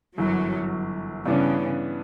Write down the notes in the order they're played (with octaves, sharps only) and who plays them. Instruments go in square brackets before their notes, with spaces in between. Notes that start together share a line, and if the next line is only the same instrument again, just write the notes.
[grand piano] G1 F#2 E3 [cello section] F#3
[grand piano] G2 E3 B3 D4 [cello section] C#3